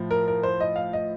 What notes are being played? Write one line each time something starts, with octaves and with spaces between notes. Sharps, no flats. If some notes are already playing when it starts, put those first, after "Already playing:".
Already playing: A2 F3
A#4
A#4
C5
D#5
F5
D#5